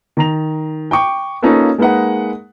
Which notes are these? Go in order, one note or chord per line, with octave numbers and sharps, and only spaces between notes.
D#3 A#5 F7
G5 C#6 D6
A#3 C#4 D#4 F4 A4 B4
G#3 A#3 D#4 B4 F#5